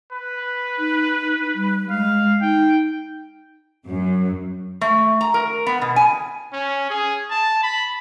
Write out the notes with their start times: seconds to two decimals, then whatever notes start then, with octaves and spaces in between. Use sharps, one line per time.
0.13 B4
0.79 D#4
1.55 G3
1.90 G#3 F5
2.42 D#4 G5
3.89 F#2
4.81 A3
5.21 A#5
5.34 A#4
5.66 B3
5.82 B2
5.96 G#5
6.53 C#4
6.90 G#4
7.30 A5
7.63 B5